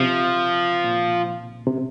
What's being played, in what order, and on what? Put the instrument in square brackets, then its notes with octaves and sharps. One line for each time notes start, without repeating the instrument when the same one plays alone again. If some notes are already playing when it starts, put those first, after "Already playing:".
Already playing: [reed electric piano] C3 [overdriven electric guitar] F3
[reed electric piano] A#2
C3